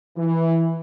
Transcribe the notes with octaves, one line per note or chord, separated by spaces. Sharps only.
E3